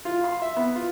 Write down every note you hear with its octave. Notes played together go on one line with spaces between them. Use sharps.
F4
C6
E5
B3
F4